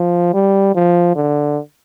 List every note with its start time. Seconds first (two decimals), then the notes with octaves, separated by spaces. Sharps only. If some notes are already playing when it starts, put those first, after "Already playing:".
Already playing: F3
0.34 G3
0.75 F3
1.16 D3